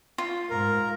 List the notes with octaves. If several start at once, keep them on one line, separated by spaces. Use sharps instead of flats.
F4
G#2 A#4